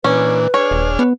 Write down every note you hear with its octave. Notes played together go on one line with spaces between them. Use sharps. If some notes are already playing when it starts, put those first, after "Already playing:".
A#2 E3 C#4 D4 B4
D4 G#4 C#5 F6
D#1
B3